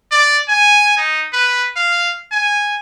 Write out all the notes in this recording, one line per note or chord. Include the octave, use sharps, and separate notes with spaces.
D5
G#5
D#4
B4
F5
G#5